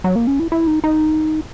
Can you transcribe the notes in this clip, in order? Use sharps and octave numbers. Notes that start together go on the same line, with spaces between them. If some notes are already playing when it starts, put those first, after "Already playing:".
F#3
A#3
C#4
E4
E4
D#4
D#4